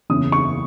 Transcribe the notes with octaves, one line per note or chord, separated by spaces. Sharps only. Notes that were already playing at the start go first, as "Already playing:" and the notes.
F#1 E2 C#3 E3 D#6
C#6